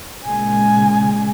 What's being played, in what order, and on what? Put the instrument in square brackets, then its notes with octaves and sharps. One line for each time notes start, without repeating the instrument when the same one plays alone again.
[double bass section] A#2 C#3 G#3 [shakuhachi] G#5